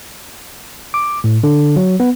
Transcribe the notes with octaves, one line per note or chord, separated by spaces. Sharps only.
D6
A2
D3
F#3
B3